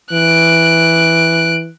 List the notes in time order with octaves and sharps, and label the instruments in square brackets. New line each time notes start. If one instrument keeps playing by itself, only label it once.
[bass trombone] E3 [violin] F#6 D7